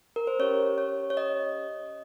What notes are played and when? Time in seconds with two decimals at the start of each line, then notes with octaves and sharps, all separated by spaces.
0.16 A#4
0.27 C5
0.39 C#4 G4 C#5
0.78 C#5
1.10 C#5
1.17 D#5